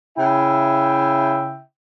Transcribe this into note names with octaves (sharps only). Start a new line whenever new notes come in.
C#3 E4 E5 G5